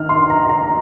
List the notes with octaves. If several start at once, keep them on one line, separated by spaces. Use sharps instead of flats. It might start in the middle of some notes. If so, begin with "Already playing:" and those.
Already playing: D#3 F6
C6
A#5
A#5